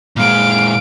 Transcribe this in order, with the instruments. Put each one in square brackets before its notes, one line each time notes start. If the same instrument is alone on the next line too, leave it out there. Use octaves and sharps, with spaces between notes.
[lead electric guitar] A#2 G#3 [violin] F5 D7